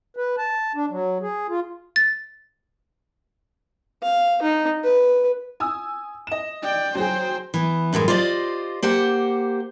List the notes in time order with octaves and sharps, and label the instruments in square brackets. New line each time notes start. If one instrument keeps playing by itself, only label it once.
[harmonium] B4
A5
D4
F#3
G#4
F4
[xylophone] A6
[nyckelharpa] F5
D#4
B4
[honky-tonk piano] G#5 D#6 E6
D#5 E7
[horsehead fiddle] D5 G5
[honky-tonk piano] F#3 G#4 [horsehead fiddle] C5 G5
[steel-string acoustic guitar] E3 B3
F#2 A2 E3 G#3
F4 G4 C5 D5 D#5
A#3 G4 C5 F#5